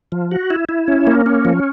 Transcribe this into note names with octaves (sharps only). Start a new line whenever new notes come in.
F3
F#4
E4
E4
C#4
A#3
C#4
F3